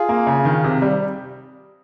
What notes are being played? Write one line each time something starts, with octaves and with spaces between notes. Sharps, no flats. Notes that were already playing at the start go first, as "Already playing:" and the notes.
Already playing: F4 G#4
A#3
C#3
D#3
C3
G3